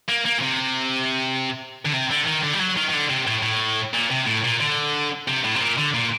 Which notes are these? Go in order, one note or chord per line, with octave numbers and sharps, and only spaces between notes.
A#3
A#3
A#2
C3
D3
C3
D3
D#3
D3
G3
F#3
D#3
D#3
D3
C3
A2
A2
A#2
C3
A2
A#2
D3
C3
A2
C3
A#2
D3
A#2